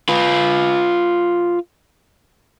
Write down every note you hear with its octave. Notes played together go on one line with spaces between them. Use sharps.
F4 B4